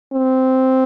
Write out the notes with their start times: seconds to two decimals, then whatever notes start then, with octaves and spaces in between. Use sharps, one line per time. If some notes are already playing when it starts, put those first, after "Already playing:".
0.13 C4